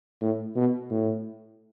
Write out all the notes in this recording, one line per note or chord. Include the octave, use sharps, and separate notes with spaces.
A2
B2
A2